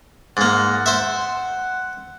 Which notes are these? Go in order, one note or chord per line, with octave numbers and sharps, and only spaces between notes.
G#2 A#3 F#5
C5 E5